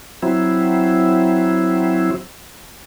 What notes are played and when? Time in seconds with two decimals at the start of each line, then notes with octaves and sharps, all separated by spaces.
0.23 F#3 C4 E4